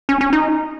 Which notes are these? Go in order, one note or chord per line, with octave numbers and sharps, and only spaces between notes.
C#4
C#4
D#4